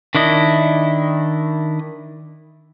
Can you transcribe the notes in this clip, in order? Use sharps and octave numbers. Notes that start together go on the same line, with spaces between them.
D#3 D4 E4 D#5